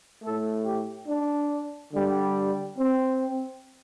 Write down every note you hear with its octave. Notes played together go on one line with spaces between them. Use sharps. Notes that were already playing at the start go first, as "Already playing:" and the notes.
A2 A3 A4
G4
D4
D3 G3
C4